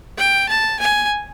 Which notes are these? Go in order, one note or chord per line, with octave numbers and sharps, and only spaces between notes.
G5
A5
G#5